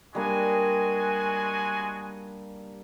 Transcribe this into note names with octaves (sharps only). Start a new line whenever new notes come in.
G3 G#3 A#3 D4 F#4 G#5